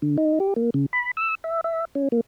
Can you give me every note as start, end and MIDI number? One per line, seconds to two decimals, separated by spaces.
0.02 0.17 50
0.18 0.39 63
0.40 0.54 67
0.56 0.70 58
0.74 0.86 49
0.93 1.11 83
1.17 1.35 88
1.44 1.61 76
1.64 1.85 76
1.95 2.08 61
2.12 2.21 58